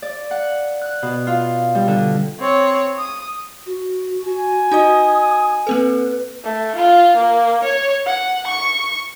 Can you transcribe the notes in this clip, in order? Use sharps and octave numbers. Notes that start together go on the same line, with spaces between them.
D5
F#5
F#6
B2
F4
G3
D3
C4 C#5
D#6
F#4
F#4 G#5
D#4 F#4 D#5 D#6
A#3 C4 A4 B4
A3
F4
A#3
C#5
F#5
C#6